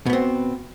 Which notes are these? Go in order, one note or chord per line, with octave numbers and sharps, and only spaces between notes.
B2 B3 C4